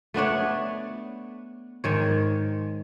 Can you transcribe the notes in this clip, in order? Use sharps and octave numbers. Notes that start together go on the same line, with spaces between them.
A3 B3 D4 C#5
G#2 D#3 C#5